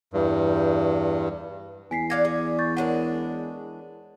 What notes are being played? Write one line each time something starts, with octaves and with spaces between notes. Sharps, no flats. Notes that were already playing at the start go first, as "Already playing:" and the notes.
E2 G2
E2 G#5 B6 C7
D5 F5 F#5 D6 G#6 A#6
G#4
C#6 G6 A6
E3 G#3 D4 A#4 C#5 F#5